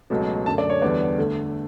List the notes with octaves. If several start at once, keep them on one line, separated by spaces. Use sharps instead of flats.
C#2 B2 F#3 A3
F#2 D3 A3 A5
D5
C#5
E2 D3 G3 B3 D5
D2 D3 A3